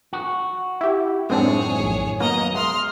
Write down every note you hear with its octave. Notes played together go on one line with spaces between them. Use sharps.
F#4
E4 G4
F#2 A2 D#3 G#3 C4 D4 G#4 C#5
A#1
F#3 A#3 B3 D#5 A#5
G#3 C6 F6